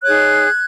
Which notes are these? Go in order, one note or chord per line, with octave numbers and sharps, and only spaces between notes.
D#4 G#4 C#5 F#6 G#6